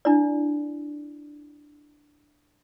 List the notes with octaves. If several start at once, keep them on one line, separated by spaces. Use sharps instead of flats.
D4 E4 D5